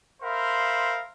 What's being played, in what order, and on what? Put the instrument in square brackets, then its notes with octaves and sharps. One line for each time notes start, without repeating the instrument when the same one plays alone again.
[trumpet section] A#4 C5 E5 F5 B5 C6